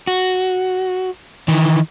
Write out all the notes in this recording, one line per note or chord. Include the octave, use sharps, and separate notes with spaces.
F#4
D#3 E3